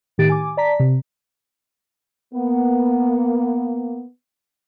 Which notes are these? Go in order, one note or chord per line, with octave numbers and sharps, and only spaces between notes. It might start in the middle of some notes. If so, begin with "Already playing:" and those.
A2 D#3 G4 A6 D7
G#5 D6
D5 A5 A#5 B6
C3
A#3 B3